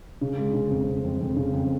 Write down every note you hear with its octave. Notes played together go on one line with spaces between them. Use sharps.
C#3
G#3
C#3
F2
F2
F2
F2
C#3
F2